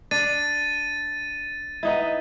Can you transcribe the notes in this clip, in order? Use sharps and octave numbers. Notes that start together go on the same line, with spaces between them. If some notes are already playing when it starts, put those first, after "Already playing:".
D4 A6 D#7
B3 D#4 E4